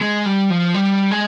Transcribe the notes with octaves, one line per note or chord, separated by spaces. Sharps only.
G#3
G3
F3
G3
G#3